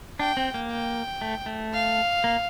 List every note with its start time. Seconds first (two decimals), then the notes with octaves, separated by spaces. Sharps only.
0.19 D4 G5
0.37 C4
0.54 A#3
0.71 G5
1.21 A3
1.46 A3
1.73 F5
2.24 A#3